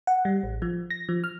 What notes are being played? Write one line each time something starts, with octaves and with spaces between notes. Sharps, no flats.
F#5
G3
A1
F3
A#6
F3
F6